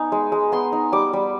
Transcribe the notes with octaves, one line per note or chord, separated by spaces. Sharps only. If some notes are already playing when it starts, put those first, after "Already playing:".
Already playing: B3 D#4 G#5
G#3
G#3
B3 C6
D#4
G3 D6
G3